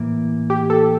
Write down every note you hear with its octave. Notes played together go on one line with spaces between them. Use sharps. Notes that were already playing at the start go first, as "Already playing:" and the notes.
Already playing: A2 E3 A#3
G4
A4